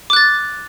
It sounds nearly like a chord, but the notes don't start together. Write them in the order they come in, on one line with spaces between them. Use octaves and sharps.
D6 F#6 A6